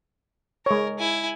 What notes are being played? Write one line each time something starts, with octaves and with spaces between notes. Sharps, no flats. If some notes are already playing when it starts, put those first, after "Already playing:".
G#3 A#4 C#5
E4 G#5